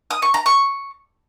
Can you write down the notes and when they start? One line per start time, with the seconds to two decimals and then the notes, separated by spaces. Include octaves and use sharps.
0.11 D#6
0.22 C#6
0.34 A#5
0.46 C#6